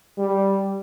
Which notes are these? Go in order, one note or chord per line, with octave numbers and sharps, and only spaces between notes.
G3